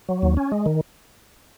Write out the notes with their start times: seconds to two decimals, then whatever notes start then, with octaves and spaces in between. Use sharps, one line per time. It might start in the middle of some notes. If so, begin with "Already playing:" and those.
0.09 F#3
0.22 D#2
0.37 C#4
0.52 G#3
0.66 D#3